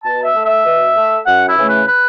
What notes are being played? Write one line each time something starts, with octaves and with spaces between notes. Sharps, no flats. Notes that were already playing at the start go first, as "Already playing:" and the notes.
B2 A5
E5
A3
E5
B2
A3
F#2 F#5
E4
C#3 E3 A3
B4
B4